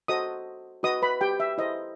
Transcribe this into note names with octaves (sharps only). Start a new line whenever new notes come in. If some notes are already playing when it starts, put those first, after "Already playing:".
F#4 A4 C5 D#5 D#6
F#4 B4 D#5 D#6
B4 B5
G4 G5
E5
E4 A4 C5 D#5